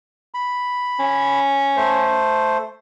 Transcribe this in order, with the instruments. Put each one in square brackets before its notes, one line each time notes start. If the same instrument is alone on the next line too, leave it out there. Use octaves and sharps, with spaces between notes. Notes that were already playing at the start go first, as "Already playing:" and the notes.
[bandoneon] B5
[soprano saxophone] C#4
[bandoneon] A3 C5